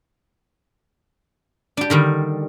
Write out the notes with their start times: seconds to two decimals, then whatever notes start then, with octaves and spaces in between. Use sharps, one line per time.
1.77 D4 G4
1.90 D3 D#3 G3